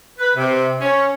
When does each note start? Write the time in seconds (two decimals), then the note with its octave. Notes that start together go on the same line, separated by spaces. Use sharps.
0.19 B4
0.36 C3
0.81 C#4